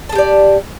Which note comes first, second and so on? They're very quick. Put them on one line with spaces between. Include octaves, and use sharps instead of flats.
A5 G#4 G4 D5